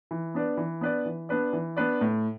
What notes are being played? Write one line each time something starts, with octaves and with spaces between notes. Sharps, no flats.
E3
B3 D4 B4 D5
E3
B3 D4 B4 D5
E3
B3 D4 B4 D5
E3
B3 D4 B4 D5
A2